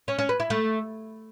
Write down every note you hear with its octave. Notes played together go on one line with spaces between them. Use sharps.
C#4
C#4
B4
E4
A3